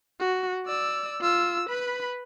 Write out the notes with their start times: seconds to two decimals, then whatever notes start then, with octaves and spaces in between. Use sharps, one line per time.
0.20 F#4
0.66 D5 E6
1.21 F4 E6
1.69 B4 B5